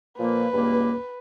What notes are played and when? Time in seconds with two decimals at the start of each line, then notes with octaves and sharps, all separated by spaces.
0.19 A#2 F3 A#3 B4
0.54 C#2 G2 A#3